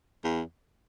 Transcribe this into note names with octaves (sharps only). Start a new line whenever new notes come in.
E2